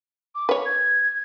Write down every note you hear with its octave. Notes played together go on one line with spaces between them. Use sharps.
D6
B4 C#5
G#6